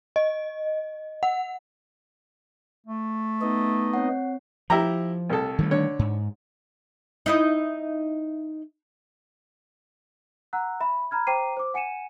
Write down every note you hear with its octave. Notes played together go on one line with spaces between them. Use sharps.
D#5
F#5
A3
B3 D#4 D#5
C4 C#5 F#5
F3 E4 G4 A#5
C2 A4
D#3 G3 A3
D3 C#5
G#2
D#4 E4 D#5
F#5 A#5 E6 F#6
E5 B5
A#5 B5 F6 G#6
C5 G5 A#5 D6 C7 D#7
C5 D6
F#5 G#5 C#7 D#7 E7